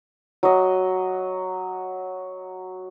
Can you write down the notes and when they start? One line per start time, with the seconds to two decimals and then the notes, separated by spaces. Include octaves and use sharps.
0.43 F#3 D#5